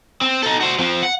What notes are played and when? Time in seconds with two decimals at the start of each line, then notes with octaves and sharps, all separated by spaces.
0.21 C4
0.43 D#4 A4
0.61 F#4 C5
0.79 F3 C4
1.03 F#5